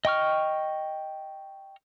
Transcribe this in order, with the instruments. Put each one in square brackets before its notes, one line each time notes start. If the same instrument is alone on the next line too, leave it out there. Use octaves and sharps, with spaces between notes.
[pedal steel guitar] D#5 G5 C#6 F6